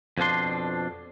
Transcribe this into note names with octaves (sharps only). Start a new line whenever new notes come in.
F2 B2 F3 D4 C6